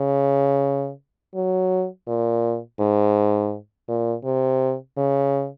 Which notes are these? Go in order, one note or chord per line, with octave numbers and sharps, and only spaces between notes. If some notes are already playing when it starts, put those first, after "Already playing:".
Already playing: C#3
F#3
A#2
G#2
A#2
C3
C#3